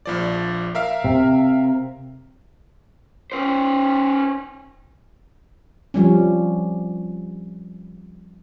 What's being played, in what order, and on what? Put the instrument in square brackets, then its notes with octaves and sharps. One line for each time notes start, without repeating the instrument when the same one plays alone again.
[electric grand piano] A#1 F3 D5
A#4 E5 F5
[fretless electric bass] C3
[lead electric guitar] C#4 C5
[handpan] F3 G3 C#4